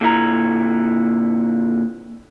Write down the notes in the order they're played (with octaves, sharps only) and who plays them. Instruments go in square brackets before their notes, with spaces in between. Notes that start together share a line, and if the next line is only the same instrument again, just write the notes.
[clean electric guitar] A#2 D3 E4 A#5